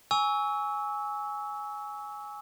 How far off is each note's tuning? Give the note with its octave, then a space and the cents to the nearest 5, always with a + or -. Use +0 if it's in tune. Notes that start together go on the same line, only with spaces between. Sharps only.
G#5 +0 C#6 +25 E6 -20